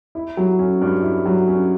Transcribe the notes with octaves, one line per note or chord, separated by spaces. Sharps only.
E4
F#3
C#4
G2
E4
F#3
C#4